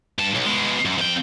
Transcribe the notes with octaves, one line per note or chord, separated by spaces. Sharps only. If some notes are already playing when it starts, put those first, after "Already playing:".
G2 A5
B1
B2 G#3
F#2
F2 G5